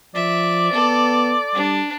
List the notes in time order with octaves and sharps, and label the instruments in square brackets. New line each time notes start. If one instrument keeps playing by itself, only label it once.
[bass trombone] F3 [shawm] D5 [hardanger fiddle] E5
[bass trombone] B3 [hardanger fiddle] A4
[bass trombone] G3 [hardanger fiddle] D4